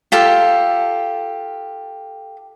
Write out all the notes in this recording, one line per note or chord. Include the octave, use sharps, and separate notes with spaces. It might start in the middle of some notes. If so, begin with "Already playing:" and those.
F4 G4 A4